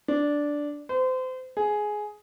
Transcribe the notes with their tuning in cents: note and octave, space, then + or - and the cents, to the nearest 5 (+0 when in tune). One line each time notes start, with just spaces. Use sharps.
D4 -5
C5 -30
G#4 +10